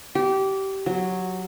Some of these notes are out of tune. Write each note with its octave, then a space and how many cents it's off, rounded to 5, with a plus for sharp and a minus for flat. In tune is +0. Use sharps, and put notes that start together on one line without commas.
G4 -20
F#3 -5